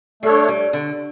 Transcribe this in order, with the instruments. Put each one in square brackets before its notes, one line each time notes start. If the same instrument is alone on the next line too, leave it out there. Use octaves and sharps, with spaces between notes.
[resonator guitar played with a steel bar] G3 [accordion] A3 D4 A4 C#5
[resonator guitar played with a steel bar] G3
D3